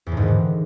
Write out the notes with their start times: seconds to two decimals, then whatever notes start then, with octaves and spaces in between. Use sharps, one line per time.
0.06 E2
0.12 A2
0.17 G#2
0.22 D#3
0.27 D3